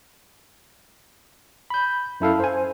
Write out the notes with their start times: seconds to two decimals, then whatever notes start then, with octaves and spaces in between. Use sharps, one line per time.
1.70 B5 G6
2.20 F#2 E4 A4 F5
2.40 C5 G#5